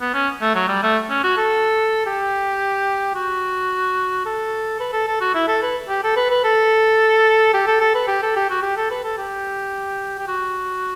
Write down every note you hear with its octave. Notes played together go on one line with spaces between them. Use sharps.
B3
C#4
A3
F#3
G3
A3
C#4
F#4
A4
G4
F#4
A4
B4
A4
A4
F#4
E4
A4
B4
G4
A4
B4
B4
A4
G4
A4
A4
B4
G4
A4
G4
F#4
G4
A4
B4
A4
G4
G4
F#4